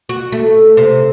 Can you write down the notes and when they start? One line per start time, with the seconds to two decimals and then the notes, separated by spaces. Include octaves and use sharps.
0.09 F#4
0.32 A3
0.77 C3